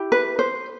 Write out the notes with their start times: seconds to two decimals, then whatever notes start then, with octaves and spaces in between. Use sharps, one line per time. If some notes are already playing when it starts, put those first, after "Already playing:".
Already playing: E4 G4
0.12 B4
0.39 C5